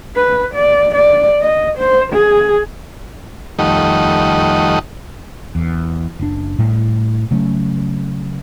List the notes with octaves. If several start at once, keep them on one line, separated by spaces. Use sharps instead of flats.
B4
D5
D5
D#5
C5
G#4
F2 D#3 G3 A3 D#4 F#5
E2
F#1 D4
A2 G3
C#3 F#3 A3 C#4